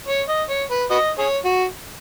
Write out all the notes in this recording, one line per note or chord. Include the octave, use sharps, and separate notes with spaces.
C#5
D#5
C#5
B4
F#4 B4 D#5
G#4 C#5
F#4